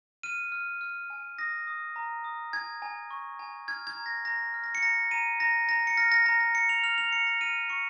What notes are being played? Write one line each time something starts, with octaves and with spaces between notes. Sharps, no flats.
F6 D#7
F6
F6
G#5
D#6 A#6
D#6
A#5
D#6
G#5 G#6
G#5
C#6
G#5
F6 G#6
G#6
A#5
A#6
A#5 A#6
F6
A#6
C#7
A#5 A#6
A#5 D#7
A#5 A#6
A#5 A#6
C#7
F6 A#6
A#6
A#5 A#6
A#6
A#5 C#7
F7
F6 F7
F7
A#5 C#7
A#6
F6 D#7
C#6 C#7